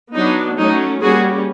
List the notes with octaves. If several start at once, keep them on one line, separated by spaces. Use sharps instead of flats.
F#3 B3 D4 D#4
F#3 A3 C#4 D#4
G3 A#3 C#4 F#4 G#4